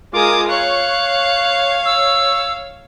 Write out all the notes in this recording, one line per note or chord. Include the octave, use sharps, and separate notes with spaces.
G#3 F4 A#4 G#5 D6 D#6
C#5 F5 C#6 F#6
E6